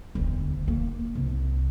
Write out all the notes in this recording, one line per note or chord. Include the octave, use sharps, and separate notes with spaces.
E1 D2
A#3
C2